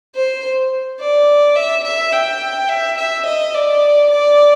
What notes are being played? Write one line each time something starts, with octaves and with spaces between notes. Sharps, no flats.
C5
D5
E5
E5
G5
E5
E5
D#5
D5
D5